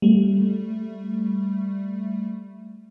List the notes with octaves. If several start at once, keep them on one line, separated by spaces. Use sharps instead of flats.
G3 A3